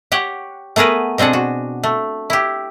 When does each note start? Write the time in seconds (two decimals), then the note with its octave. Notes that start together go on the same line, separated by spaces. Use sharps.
0.12 G4 C#5 F#5 G5
0.76 A3 B3 G#4 A#4 B4
1.18 B2 C4 D4 G#4 F#5
1.33 F#4
1.83 A3
2.30 E4 G4